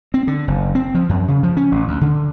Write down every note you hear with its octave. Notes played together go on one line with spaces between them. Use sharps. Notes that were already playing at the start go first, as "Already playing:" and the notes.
C4
D3
F#1
C4
F3
F#2
C#3
F3
C#4
A1
D2
D3